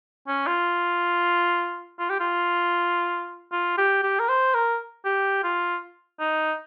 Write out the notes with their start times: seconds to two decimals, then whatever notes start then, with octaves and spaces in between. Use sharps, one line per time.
0.28 C#4
0.47 F4
1.99 F4
2.10 G4
2.20 F4
3.52 F4
3.78 G4
4.03 G4
4.20 A#4
4.28 C5
4.54 A#4
5.05 G4
5.43 F4
6.20 D#4